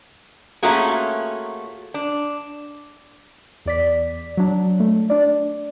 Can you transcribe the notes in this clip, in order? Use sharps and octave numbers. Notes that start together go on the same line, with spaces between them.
A3 A#3 C#4 F4 F#4 G#4
D4
E2 D5 B6
F#3 D4
A3
D4 D5